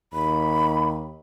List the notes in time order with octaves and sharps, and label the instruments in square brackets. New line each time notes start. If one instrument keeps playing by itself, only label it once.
[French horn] D#2 [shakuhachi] B5